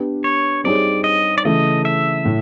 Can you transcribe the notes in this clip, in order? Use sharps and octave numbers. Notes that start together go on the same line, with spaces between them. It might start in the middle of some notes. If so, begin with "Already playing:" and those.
Already playing: B3 D4 G4 B4
C#5
G3 C4 D#4 G#4 C#5 D5
D#5
D5
C#3 E3 A3 D#5
E5
A2